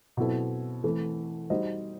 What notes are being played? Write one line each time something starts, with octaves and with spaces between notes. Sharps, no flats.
B2 F#3 C4 E4 A4
E3 A3 C4
G3 D#4 F#4 C5 D#5